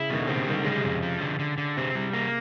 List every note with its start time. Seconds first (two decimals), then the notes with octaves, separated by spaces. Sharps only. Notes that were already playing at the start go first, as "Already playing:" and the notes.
Already playing: C#3 E4
0.10 B2 D#3
0.20 D3
0.27 C#3 C4
0.37 C3
0.46 D#3 G3
0.56 D3
0.64 C#3 G#3
0.77 C3
0.83 F2 C#3
1.02 F3
1.20 D3
1.39 D3
1.58 D3
1.77 C3 C4
1.95 C3 G3
2.13 A#3